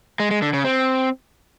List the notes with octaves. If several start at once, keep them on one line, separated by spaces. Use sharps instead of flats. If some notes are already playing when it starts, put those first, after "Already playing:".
G#3
G#3
D3
C#3
C4